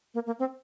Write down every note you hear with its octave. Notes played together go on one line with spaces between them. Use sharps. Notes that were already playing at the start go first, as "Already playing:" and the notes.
A#3
A#3
C4